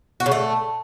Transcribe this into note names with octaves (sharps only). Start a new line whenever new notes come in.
F#4
C#3
A3